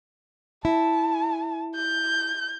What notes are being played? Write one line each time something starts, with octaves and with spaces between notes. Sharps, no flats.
E4 A5
G6